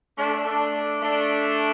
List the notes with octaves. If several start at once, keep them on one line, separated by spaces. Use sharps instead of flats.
A3 D4
A3 D4
A3 D4